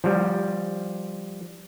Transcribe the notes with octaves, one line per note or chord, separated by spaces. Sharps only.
F3 G3